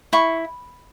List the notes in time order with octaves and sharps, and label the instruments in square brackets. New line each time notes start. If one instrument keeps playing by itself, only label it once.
[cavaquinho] E4 C#6